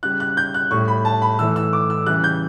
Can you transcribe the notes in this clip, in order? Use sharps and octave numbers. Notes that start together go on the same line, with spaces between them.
C#3 G3 F#6
F#6
G6
F#6
A2 G3 C#6
B5
A5
B5
A2 E3 A3 E6
E6
D6
E6
C#3 E3 G3 F#6
G6